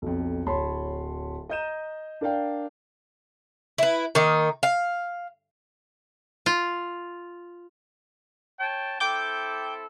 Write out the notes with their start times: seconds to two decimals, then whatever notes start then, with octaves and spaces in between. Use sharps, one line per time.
0.02 B1 F2
0.47 D1 C#5 A5 B5 C6
1.49 D#5 A#5 G6 D#7 E7
2.21 D4 A#4 D5 F5 G5
3.78 E4 B4
4.15 D#3 A#3 D#4
4.63 F5
6.46 F4
8.59 C#5 G5 A5
9.00 C4 E4 A4 G5 D6 G6